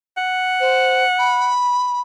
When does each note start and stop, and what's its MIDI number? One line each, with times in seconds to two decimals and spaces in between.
0.17 1.51 78
0.60 1.03 72
1.18 2.01 83